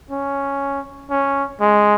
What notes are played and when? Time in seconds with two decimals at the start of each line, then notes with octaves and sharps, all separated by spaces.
0.11 C#4
1.10 C#4
1.61 G#3